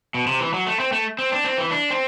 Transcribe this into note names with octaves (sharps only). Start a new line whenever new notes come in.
B2
C3
E3
F#3
A3
C4
A3
C4
D4
C4
E3
D4
C4